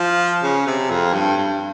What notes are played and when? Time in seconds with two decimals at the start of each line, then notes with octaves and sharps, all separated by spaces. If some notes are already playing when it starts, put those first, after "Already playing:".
Already playing: F3
0.43 C#3
0.67 C3
0.90 F2
1.13 G2
1.37 G2